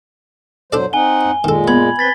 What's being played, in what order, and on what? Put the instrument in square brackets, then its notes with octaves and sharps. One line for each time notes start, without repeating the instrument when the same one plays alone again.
[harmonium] F#3 C5 [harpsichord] D4 A4 D5
[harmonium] C4 D#4 F#5 [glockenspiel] G#5 G7
[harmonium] A#2 G#3 [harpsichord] D#3 A4
[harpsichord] B3 [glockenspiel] B5 G#6 F#7
[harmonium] C4 B4 [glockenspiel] A6 B6 G7